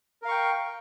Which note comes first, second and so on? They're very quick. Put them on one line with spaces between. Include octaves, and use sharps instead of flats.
A#4 F5 C#6 G5